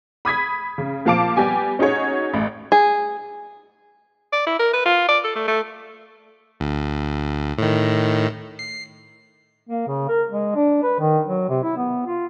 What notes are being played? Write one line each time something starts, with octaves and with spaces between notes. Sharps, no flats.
B5 D#6 G#6 B6
C#3
A#2 F3 F5 A5 D6 D7
G3 B3 G4 G#5 D6
C#4 D#4 F#4 G#4 C#5
A1
G#4
D5
E4
A#4
B4
F4
D5
A4
A3
A3
D2
A2 D#3
C7
A#3
C#3
A#4
G#3
D4
B4
D#3
F#3
C3
E4
B3
F4